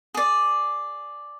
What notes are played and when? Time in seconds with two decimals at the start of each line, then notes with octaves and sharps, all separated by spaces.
0.14 G#4 D5